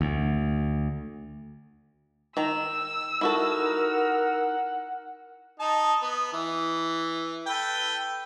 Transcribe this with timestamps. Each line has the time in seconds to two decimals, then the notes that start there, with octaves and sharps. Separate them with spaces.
0.01 D2
2.37 D#3 A#5 E6
3.21 D#4 E4 F#4 A4 A#4 F#5
5.60 D#4 A5
6.02 B3
6.33 E3
7.47 A4 B4 G5